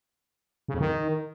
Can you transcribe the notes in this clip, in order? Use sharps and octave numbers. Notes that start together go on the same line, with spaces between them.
C#3
F2
D#3